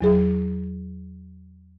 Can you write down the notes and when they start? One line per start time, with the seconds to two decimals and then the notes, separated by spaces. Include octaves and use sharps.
0.01 E2 F#3 G#4